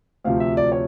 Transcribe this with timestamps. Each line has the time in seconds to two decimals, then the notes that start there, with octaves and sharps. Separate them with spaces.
0.25 D2 C3 F3 F5
0.40 E5
0.57 D5
0.72 C#5